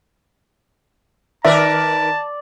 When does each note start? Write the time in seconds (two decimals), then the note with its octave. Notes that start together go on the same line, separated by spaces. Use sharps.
1.44 D#3 A#4 B4 D5 E5 A5